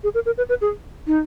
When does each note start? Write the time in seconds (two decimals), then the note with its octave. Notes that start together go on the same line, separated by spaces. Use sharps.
0.04 G#4
0.14 A#4
0.26 A#4
0.37 B4
0.49 B4
0.61 G#4
1.07 D#4